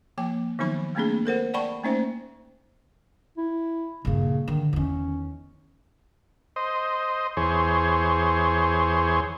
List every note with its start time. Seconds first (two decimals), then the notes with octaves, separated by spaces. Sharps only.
0.18 F3 A#3 G5
0.59 D#3 F3 F#3 B3 D#4 B5
0.95 G3 A3 A#3 C4 D4 G#4
1.25 A4 A#4 C5 F#5
1.54 D5 F#5 G5 A5 B5 C#6
1.84 A3 A#3 C#4 D#4 C5 E5
3.38 E4
4.05 G2 A#2 C#3
4.48 D3 D#3
4.73 E2 D#3 C#4
6.56 C5 D#5
7.37 E2 G#4 C5 C#5